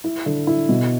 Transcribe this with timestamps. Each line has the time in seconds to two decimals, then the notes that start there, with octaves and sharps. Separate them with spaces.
0.04 E4
0.26 D3
0.47 E4
0.69 B2